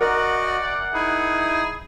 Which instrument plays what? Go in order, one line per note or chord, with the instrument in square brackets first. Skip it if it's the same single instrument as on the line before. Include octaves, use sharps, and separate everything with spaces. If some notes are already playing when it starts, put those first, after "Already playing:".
[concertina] F#4 D#5 [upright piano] A#4 [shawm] D5 [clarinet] F#5
[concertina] D#4 E4 [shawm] G#4